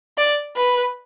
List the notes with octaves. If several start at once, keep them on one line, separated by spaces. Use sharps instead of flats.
D5
B4